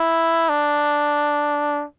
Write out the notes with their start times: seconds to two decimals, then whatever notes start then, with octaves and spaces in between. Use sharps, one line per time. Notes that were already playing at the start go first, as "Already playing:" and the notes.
Already playing: E4
0.49 D4